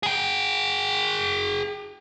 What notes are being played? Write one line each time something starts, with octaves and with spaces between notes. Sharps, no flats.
G#4 G5